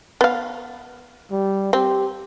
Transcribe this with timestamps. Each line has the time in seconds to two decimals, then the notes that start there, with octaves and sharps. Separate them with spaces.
0.21 B3 F5
1.31 G3
1.73 C4 G4